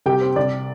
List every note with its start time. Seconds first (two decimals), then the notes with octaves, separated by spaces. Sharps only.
0.06 C2 G4 G5
0.21 C4
0.36 C2 D5